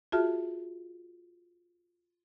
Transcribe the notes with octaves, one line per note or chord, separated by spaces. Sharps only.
F4 F#4 G#4 E5 A5 F6